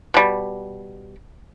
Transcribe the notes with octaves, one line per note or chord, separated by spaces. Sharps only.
B2 G3